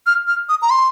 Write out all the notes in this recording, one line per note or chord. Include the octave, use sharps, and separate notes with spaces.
F6
F6
D#6
A#5
C6